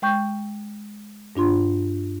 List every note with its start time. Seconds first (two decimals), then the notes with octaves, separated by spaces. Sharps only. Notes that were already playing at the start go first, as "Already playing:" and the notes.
0.02 G#3 G5 C#6 G6
1.36 G2 D4 F4 C6